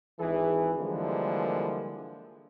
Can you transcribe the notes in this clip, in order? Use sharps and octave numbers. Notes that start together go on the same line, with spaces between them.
G#1 E3 G#4
D3 E3 F3 G3 G#3 A#3